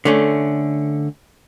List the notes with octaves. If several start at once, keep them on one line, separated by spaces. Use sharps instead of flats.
D3 A3 C#4